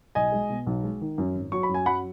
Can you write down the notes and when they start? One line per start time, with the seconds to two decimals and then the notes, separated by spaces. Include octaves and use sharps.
0.15 B1 D#5 G#5
0.32 G#3
0.50 B2
0.67 B1
0.83 G#3
1.01 D#3
1.18 F#2
1.35 G#1
1.52 F#3 C#6
1.63 B5
1.69 F#2
1.74 G#5
1.86 F#3 F#5 B5